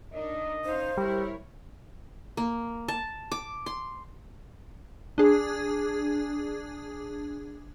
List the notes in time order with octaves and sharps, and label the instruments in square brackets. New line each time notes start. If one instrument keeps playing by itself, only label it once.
[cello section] D4 D#4 A#4 [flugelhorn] D#5
[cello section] C#4 D#4 F5 [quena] C5
[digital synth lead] G3 [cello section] E4 A#4 C#5
[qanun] A#3
A5
D6
C6
[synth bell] D4 G#4